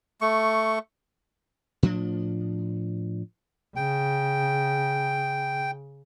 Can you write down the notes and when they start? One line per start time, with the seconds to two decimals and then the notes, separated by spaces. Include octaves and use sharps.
0.21 A3 C#6
1.83 A2 F3 D4
3.76 C#3 G5